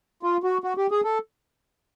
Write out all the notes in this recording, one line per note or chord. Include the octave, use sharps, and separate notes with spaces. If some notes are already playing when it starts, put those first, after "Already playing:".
F4
F#4
F#4
G4
G#4
A4